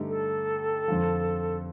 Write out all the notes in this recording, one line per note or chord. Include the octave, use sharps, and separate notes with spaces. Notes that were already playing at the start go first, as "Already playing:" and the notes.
Already playing: G2 D3 A3 D#4 G4
A4
F2 D3 F3